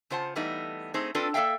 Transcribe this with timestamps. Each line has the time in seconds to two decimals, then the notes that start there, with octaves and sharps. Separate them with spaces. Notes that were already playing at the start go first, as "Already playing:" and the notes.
0.10 C#3 F4 C5 F#5 A5
0.36 E3 G3 A3 B3 D#4
0.94 A3 C4 D#4 G#4 C5
1.15 C4 D4 F4 A4 B4
1.34 A#3 A4 D5 E5 F5 G5